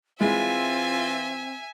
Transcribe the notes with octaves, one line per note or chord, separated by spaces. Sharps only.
E3 G#3 C4 E4 F4 E5 G#5